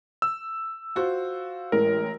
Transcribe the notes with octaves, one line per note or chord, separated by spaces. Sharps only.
E6
F4 F#4 C5
A1 E3 G#3 A#4